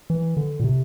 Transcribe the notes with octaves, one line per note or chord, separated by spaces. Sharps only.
E3
D3
A#2
C3